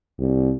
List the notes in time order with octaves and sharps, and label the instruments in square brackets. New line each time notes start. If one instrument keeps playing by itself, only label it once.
[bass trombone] C2